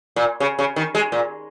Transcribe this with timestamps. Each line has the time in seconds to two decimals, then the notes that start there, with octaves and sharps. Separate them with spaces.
0.16 A#2
0.40 C#3
0.59 C#3
0.76 D#3
0.95 G#3
1.12 A#2